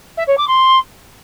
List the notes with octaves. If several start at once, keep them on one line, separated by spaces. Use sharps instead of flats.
E5
C#5
D6
C6